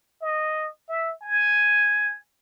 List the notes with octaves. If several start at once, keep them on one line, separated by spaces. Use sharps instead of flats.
D#5
E5
G#5